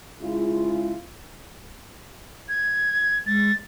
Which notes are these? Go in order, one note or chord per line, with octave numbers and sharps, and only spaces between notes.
C#3 G#3 E4 F4
G#6
G#3 A6